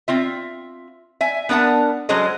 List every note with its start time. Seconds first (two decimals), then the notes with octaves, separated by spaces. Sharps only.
0.08 C4 F4 E5
1.21 E5 G#5
1.49 B3 D4 A#4 F#5 A5
2.09 F#3 G#3 C#4 A4 C5 D#5